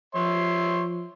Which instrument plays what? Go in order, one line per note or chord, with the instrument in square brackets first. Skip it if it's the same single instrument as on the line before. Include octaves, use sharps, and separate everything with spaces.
[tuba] F3 [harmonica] C#5 E5 C6